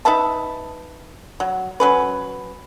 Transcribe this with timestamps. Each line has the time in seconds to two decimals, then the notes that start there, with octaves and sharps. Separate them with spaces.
0.05 D#4 B4 E5 A5
1.40 F#3
1.80 F#3 C#4 B4